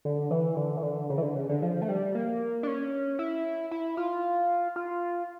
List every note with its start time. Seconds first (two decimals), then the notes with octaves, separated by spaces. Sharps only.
0.05 D3
0.31 E3
0.57 D3
0.77 E3
0.83 D3
1.10 C#3
1.18 E3
1.22 D3
1.35 C#3
1.49 D3
1.62 F3
1.82 A3
1.88 G3
2.15 A#3
2.63 D4
2.67 C#4
3.19 E4
3.71 E4
3.97 F4
4.76 F4